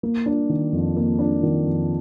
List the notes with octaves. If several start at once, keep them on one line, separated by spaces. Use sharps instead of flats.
A#3
D4
D#3
F2
A#3
D4
D#3
F2